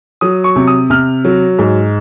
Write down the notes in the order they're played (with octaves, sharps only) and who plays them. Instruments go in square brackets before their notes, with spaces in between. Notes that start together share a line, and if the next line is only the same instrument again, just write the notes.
[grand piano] F#3 D#6
C#6
C3
D#6
C3 F6
F#3
G#2